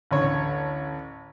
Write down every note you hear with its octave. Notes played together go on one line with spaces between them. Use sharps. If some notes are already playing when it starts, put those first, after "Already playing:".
A1 D2 C#5